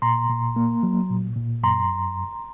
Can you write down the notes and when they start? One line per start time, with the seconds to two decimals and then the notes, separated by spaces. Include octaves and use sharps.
0.02 A#2 A#5 C6
0.29 A#2
0.56 A#3
0.83 F#3
1.10 A#2
1.36 A#2
1.63 F#2 A#5 C6